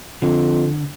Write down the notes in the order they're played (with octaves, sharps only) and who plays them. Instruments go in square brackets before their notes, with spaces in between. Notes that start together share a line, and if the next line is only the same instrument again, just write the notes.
[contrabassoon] F2 [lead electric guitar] D3